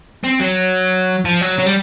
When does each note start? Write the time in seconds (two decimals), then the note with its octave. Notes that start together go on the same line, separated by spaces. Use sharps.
0.24 C4
0.40 F#3
1.25 F3
1.41 F#3
1.59 F#3
1.66 G3